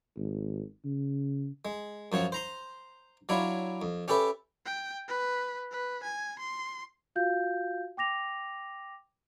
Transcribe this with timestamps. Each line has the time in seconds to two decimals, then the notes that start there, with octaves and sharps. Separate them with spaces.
0.17 G#1
0.85 C#3
1.65 G#3
2.12 F#2 F3 C#5 F#5
2.32 C5 A#5 C6
3.29 F#3 D4 E4 F4 C#5
3.82 F2
4.08 C#4 G4 A4 B4 E5
4.66 G5
5.08 B4
5.71 B4
6.03 G#5
6.40 C6
7.16 F4 F#4 F5 G6
7.97 G5 D6 A#6 F7